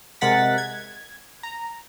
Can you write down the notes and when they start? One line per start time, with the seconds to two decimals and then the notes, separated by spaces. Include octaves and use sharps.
0.21 C3 G#3 A#4 F#5 A6 B6
0.58 G#6
1.43 A#5